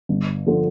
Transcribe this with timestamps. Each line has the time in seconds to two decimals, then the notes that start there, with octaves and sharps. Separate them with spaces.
0.09 G1
0.46 D3 F3